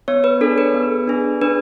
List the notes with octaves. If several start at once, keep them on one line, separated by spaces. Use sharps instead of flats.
B3 C#5
B4
D4 G#4 A4
B4
B3
D4 G#4
D4 B4